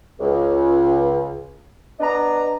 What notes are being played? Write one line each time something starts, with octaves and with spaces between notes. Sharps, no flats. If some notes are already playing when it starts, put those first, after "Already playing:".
C#2
B3 D4 D#5 A#5